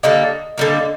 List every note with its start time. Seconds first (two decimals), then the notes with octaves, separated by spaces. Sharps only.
0.03 D3 G3 A#3 D#5
0.58 D3 G3 A#3